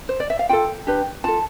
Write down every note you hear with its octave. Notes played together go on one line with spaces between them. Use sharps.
C5
D5
E5
F5
F4 A4 G5
D4 G4 B4
F4 A4 A5